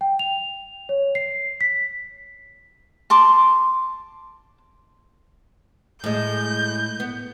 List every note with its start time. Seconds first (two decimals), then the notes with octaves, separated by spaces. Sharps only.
0.01 G5
0.19 F7
0.89 C#5
1.15 C7
1.61 B6
3.10 A5 C6 D6
6.04 A2 G#3 G6
7.00 B3